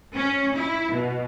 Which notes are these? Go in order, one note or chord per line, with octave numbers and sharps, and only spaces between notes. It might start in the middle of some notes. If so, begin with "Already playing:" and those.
C#4
E4
B2